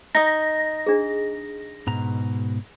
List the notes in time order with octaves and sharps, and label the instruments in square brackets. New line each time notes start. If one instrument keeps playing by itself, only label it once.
[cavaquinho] D#4 D#5 [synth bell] A#6
[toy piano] D4 G#4
[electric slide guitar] G#2 B2 A#5